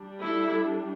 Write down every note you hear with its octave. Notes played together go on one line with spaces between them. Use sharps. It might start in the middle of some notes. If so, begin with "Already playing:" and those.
Already playing: G3 D4
E4 A4